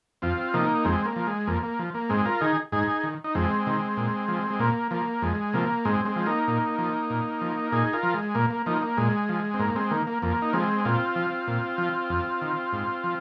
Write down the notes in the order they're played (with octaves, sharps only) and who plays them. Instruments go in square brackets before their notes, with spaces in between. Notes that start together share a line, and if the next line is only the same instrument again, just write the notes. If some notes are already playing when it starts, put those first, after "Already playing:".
[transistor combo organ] F2 C4 F4
C3 F3 A#3 D#4
F2 G#3 C4
A#3
F3
G#3
F2 A#3
A#3
F3
A#3
G#2 G#3 C4
F4 A#4
D#3 D#4 G#4
G#2 D#4 G#4
D#3
D#4
F2 G#3 C4
C3 D#3
A#2
F3
G#3
A#2 A#3
F3 A#3
F2 G#3
C3 F3 A#3
G#2 G#3 C4
G#3 C4
F3
A#3 D#4
A#2
F3
A#2
F3
A#2 D#4 G#4
F4 A#4
F3
G#3
A#2 A#3
A#3
F3 A#3 D#4
A#3
A#2 G#3
F3
C4
G#2 A#3
G#3 C4
D#3 A#3
A#3
F2 A#3
D#4
F3 G#3 C4
A#2 C4 F4
F3
A#2
F3
F2
D#3
G#2
F3